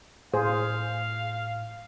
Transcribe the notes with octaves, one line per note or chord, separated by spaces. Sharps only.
A2 G#4 C5 F5